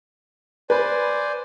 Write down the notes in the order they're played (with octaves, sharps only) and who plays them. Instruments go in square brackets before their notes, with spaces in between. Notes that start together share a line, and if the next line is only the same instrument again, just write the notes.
[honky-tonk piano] B4 [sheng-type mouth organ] C5 D5 G#5